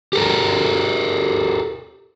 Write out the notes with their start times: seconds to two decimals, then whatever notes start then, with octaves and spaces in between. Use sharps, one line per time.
0.13 G4 A4 A#4